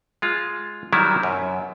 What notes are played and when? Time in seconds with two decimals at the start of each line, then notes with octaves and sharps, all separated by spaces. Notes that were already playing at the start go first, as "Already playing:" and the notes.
0.22 G#3 F4
0.93 D#3 F#3 G3 E4
1.23 F#2